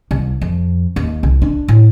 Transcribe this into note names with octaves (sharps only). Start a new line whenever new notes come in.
C2
F2
D#2
C2
D4
A2